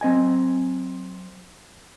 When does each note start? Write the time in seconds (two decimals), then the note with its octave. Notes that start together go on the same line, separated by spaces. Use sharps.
0.01 F#3 C4 D#5 G#5